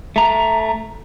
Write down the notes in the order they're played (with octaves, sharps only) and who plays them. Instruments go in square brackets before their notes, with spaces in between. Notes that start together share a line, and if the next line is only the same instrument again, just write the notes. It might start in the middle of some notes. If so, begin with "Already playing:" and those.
[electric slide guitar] A3 A#5